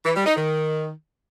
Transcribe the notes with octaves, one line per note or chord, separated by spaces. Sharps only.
E3
G3
D#4
D#3